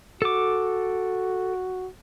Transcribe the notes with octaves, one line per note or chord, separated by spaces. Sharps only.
F#4 A4 D6